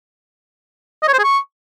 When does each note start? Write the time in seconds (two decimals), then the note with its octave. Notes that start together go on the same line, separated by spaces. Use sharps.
1.03 D#5
1.08 C#5
1.13 C5
1.19 G#4
1.24 C#6